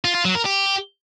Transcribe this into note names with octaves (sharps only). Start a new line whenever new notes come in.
F4
F4
F#3
A#4
G4